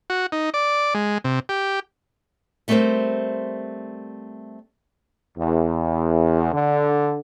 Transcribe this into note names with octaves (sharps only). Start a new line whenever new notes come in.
F#4
D#4
D5
G#3
C3
G4
G3 A3 B3 C4 A#4 C5
E2
D3